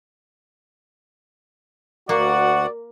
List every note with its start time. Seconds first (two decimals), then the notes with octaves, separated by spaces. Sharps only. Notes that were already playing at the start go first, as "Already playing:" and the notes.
2.09 D2 A#3 F#4 D5 F#5